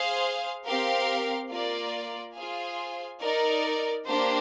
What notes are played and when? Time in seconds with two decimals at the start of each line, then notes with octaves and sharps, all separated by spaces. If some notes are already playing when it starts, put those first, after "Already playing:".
Already playing: G#4 C5 F5
0.66 C4 G4 A#4 F5
1.50 A#3 F4 A#4 D5
2.36 F4 G#4 C5 F5 G#5
3.21 D#4 A#4 D5
4.06 A#3 D4 G4 C5